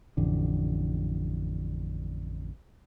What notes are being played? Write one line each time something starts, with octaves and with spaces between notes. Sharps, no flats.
A1 F2 D3